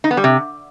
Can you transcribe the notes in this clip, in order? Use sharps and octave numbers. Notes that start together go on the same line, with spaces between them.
D#4
B3
G3
C3